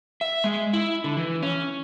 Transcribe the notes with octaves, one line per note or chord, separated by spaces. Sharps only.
E5
G#3
E4
D3
E3
C#4